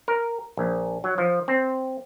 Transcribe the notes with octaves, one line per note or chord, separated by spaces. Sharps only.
A#4
A#1
F#3
F3
C4